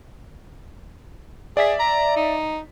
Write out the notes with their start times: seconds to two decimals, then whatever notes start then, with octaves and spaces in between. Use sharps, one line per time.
1.57 G#4 D5 E5 B6
1.79 A#5
2.16 D#4